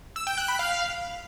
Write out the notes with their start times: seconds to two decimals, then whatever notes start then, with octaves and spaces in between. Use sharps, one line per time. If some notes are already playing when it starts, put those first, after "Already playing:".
0.16 E6
0.27 G5
0.38 F#6
0.48 B5
0.59 F5